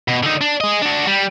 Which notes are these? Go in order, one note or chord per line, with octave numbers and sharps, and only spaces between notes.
B2
D3 D#4
D4
G#4 D#5
D4 F#4
G3